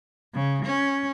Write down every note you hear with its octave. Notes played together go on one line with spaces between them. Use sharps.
C#3
C#4